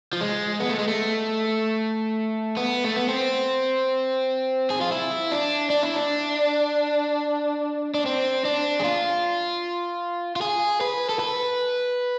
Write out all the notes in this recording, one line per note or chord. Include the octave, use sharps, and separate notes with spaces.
F3
G#3
B3
A3
G#3
A3
B3
A3
B3
C4
G#4
F4
E4
D4
D4
E4
D4
D4
C4
D4
G#4
F4
F4
G#4
B4
A4
B4